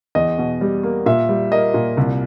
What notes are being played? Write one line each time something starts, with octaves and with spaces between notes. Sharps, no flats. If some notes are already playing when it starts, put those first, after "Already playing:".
E2 D#5
B2
G3
A#3
A#2 E5
G3
A#3 D#5
A#2
C2